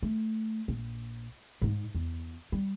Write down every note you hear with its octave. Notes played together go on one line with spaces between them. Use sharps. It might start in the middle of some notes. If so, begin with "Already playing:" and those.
A3
A#1
G#2 D#4
E2
G3